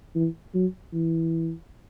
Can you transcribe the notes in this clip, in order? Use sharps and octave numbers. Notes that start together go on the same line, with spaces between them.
E3
F#3
E3